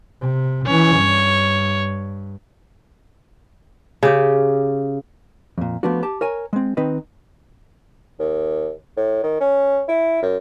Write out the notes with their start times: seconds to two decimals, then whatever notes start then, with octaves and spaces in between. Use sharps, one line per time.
0.22 C3
0.67 E3 C#4 C#5
0.97 G2
4.03 C#3 G4
5.58 F2 A#2
5.83 F3 A3 B3 D4 F#4
6.03 G4 A5
6.21 A#4 C#5 G#5
6.53 G#3 C4
6.77 D#3 C4 D#4 B4 D#5
8.19 D#2
8.97 A2
9.24 D#3
9.40 C#4
9.88 E4
10.22 F#2